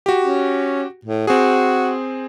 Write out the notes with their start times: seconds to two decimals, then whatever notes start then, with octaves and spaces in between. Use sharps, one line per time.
0.06 F#4 G4
0.23 C#4
1.05 A2
1.27 C4 F#4 G#4